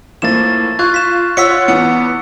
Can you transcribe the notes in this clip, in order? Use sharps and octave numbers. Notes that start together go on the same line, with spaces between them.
A2 F3 A#3 A6 E7
F4 C#6 F#6 G#6
B6 E7
F4 C#5 F#5 E6 B6 C#7
E2 B3 C#7